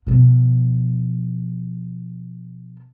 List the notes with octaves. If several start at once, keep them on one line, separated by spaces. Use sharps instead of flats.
B2 F3